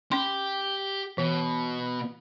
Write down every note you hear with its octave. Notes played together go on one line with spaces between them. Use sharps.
C#4 G4 C6
B2 E3